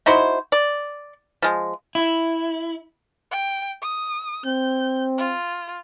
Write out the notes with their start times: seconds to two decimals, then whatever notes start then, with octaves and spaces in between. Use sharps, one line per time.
0.06 D#4 E4 F#4 C5
0.52 D5
1.42 F3 G#3
1.95 E4
3.31 G5
3.82 D#6
4.45 C4 G6
5.18 F4